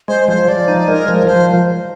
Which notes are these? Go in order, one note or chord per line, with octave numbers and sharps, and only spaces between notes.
G#3 C5
F3 C5
F3 D5
D#4
G#3 A#4
F3
F3 C5